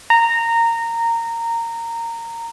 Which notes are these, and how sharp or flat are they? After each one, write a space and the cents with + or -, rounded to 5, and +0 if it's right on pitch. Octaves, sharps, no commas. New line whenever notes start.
A#5 -15